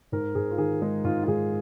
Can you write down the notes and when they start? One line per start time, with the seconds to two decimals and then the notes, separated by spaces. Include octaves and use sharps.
0.12 G#2 A#4
0.35 G#2 G#4
0.51 F4
0.58 D#3 G#4
0.82 G#3 D#4
1.04 G#2 F4
1.23 F4
1.28 G#2 G#4